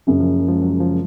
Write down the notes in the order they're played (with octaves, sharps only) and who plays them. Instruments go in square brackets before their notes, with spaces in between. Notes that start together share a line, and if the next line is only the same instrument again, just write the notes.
[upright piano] F#1 F#2 C#3 [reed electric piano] F#3
[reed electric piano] F3
F3 G#3
F#3
F3